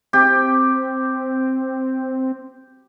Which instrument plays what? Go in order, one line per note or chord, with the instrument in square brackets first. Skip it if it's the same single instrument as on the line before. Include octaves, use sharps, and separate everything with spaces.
[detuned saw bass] C4 [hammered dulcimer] G4